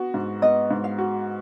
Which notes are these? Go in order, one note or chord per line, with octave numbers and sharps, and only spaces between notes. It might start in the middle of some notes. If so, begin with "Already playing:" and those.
Already playing: B3 F#4
G#2
B3 D#5
G#2
F5
F#4